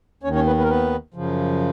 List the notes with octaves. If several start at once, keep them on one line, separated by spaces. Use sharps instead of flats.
D#2 D#3 C#4 C#5
C#4 C#5
B3 B4
B3 B4
A#4
B3 B4
F#2 C#3 F3